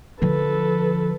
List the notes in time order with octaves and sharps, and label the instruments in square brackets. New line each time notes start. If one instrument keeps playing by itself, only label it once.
[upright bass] D3 F3 [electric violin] A4 B4